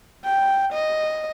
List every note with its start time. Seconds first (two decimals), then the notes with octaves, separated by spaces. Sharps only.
0.24 G5
0.73 D#5